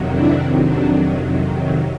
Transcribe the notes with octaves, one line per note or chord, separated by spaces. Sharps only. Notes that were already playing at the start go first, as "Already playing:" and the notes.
Already playing: F2 C3 D#3 F#3
D4 E4
D4